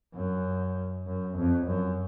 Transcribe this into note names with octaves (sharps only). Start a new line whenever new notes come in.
F#2
F#2
F2
F#2